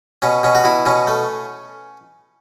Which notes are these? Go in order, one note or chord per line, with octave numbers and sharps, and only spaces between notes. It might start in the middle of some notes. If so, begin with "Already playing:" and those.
B2 C#4
B2 C#4
F#4
B2 E4
B2 C#4
A3